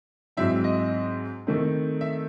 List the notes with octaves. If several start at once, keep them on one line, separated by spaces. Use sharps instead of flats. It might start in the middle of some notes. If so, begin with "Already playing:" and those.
G#2 F#3 C4 E4 E5
D#5
D#3 A3 C4
E5